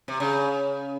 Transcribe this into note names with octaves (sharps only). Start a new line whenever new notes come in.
C3
C#3